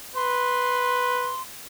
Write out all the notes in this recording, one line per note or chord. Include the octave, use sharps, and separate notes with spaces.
B4 C6